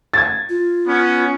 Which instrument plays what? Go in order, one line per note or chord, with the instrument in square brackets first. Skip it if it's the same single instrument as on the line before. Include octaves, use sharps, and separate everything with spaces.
[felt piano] G#6 A6
[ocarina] F4
[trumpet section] B3 C#4